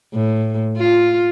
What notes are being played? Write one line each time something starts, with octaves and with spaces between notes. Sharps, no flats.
A2
F4